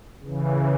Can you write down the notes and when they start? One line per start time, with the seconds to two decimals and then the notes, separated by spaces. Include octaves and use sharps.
0.22 C#3
0.27 E3